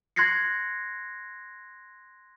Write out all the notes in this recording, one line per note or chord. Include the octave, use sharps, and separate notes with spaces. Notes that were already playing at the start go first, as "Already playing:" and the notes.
C6 F#6 G#6 A#6 C7 C#7